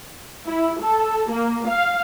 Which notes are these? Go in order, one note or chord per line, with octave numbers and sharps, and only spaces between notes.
E4
A4
A#3
F5